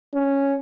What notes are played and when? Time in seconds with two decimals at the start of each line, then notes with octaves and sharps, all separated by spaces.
0.14 C#4